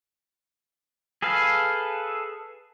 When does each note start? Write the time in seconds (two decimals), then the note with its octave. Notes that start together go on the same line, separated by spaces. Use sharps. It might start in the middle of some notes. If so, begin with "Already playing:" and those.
1.22 G#4 A4 B4 F5